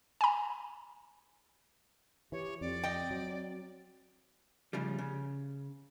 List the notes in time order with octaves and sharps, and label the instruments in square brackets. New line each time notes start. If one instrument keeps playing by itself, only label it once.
[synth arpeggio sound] G#5 A#5
[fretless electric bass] E3 [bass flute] G4 [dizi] C#5
[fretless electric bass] F2 [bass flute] C4 [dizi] D5
[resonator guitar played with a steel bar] D#5 G5
[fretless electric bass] F#3
[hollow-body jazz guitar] A2 C#3 F3 G3
C#3